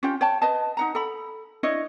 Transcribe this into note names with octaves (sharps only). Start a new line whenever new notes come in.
C#4 F4 G4 G5
C#5 G5 A5
B4 D#5 A5
D#4 F#5 A#5
A4 B5
D4 E4 C#5 D#5